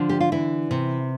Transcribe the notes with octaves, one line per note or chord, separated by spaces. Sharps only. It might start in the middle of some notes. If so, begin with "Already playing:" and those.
Already playing: D3 F3
G4
F4
E3 E4
C3